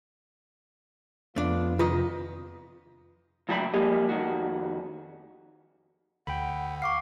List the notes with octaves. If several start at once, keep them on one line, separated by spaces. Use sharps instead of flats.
F2 A3 B3 D4 F4
C3 D#3 F4 B4 D#5
C#2 A2 F#3 E5 G5 B5
F3 G3 G#3 A#3 G4 D#5
F2 D#3 F#4
D2 D3 F#5 G5 B5
F5 C#6 D6 C7